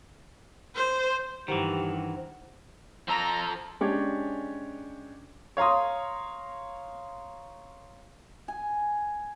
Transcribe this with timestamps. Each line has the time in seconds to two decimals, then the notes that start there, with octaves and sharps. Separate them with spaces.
0.75 C5
1.48 G2 D#3 E3 G4 C5 F#5
3.08 F3 A4 A#5
3.81 G#3 C#4 D4 G4 C#5
5.57 C#5 F5 A#5 C6 D#6
8.48 G#5